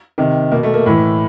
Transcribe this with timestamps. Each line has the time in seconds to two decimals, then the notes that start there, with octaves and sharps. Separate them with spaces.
0.18 C3 D#3
0.51 B2 A#3
0.63 A3
0.74 A#3
0.86 A2 E3